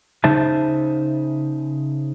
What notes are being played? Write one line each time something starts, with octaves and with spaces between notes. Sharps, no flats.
C#3 D#4 C5 E5 A5